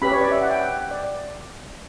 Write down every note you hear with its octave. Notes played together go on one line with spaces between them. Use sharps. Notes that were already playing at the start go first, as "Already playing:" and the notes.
C#4 G4 B4 B5
C#5
D5
E5
F#5
G5
D5